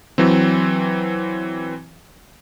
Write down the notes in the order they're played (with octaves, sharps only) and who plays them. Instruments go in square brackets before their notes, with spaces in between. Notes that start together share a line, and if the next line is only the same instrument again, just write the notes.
[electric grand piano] E3 F#3 C4